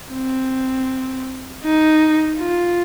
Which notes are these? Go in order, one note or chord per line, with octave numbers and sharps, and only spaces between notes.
C4
D#4
F4